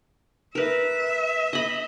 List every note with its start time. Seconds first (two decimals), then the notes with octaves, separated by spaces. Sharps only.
0.55 A#4 B4 E5
1.53 D#5 B5